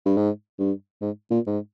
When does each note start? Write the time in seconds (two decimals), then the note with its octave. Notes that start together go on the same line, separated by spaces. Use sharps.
0.06 G2
0.17 G#2
0.59 G2
1.02 G#2
1.31 A#2
1.47 G#2